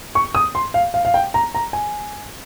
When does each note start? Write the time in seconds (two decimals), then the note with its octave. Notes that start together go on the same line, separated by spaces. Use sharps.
0.15 C#6
0.35 D#6
0.55 C6
0.74 F5
0.94 F5
1.05 F5
1.14 G5
1.34 A#5
1.55 A#5
1.73 G#5